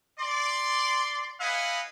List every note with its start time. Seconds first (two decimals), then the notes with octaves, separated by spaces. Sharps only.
0.19 D5 C6
1.40 E4 B4 D#5 F5 F#5 G#5